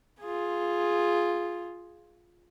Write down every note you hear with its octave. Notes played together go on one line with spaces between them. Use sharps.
F4 G#4